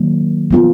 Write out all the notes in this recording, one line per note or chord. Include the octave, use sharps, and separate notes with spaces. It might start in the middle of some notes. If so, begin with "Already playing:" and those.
Already playing: D#3 F#3 A#3
F3 B3 F4